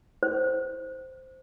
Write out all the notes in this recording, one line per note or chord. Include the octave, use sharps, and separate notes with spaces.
C5